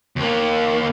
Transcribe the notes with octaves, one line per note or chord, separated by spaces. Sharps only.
D#2 A#3